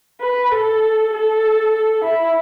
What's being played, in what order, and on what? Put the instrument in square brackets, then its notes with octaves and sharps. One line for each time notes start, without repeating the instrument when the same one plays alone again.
[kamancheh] B4
A4
A4
E4